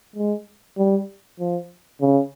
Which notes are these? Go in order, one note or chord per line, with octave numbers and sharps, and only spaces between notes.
G#3
G3
F3
C#3